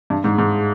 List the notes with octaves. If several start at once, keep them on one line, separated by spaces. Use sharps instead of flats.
G2
G#2
G#2